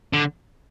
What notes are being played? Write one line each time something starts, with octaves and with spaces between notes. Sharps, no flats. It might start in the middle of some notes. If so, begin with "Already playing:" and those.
D3